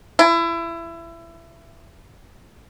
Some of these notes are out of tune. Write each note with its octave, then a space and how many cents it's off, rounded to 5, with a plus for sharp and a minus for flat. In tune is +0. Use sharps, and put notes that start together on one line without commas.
E4 +25